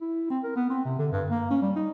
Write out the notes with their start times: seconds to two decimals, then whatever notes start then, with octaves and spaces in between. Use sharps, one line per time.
0.01 E4
0.30 C4
0.44 A#4
0.56 B3
0.70 C4
0.85 C3
0.99 D3
1.12 G2
1.30 A#3
1.51 C#4
1.62 G3
1.76 D#4